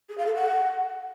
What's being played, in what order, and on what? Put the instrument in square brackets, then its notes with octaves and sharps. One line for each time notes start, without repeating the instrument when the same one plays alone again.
[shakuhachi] G#4
F5
A4
F#5